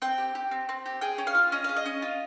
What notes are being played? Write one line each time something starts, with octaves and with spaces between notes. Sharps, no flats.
C4 G5
G4
G4
C4
C4
G4
G#4 G5
C#4
F5
F4
C#4 D#5
G#4 F5
D#5
C#4
F4